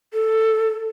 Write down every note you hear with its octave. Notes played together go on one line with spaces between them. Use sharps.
A4